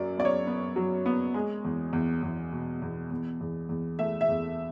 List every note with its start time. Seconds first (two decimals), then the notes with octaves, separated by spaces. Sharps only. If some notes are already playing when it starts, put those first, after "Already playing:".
Already playing: F#2 F#3 D5
0.18 B3 D5
0.25 C#5
0.47 B3
0.76 F#3
1.06 B3
1.34 G#3
1.65 E2
1.93 E2
2.23 E2
2.52 B2
2.82 E2
3.11 E2
3.41 E2
3.69 E2
3.99 A3 E5
4.21 E5
4.29 E2